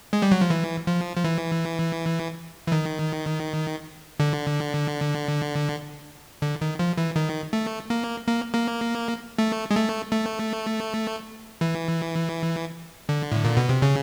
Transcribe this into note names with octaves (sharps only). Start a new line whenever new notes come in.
G#3
G3
F#3
F3
E3
F3
F3
E3
E3
D#3
D3
D3
D#3
F3
E3
D#3
A3
A#3
A#3
A#3
A3
G#3
A3
A3
E3
D3
A2
A#2
B2
C3
C#3